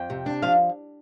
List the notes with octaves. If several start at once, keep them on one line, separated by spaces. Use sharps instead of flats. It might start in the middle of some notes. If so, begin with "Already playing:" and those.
Already playing: F2 G5
C3
D4
F3 F5